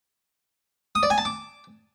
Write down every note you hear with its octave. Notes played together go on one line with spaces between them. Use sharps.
D#6
D5
G#5
A5
D6